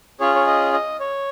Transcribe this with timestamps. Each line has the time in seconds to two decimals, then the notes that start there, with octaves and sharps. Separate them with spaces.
0.20 C#4 F4 G#4 C#5
0.35 C#5
0.47 D#5
0.73 D#5
1.00 C#5